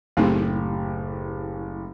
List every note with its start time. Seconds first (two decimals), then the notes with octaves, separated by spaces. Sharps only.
0.17 F#1 A2 A3 C4 D#4 G4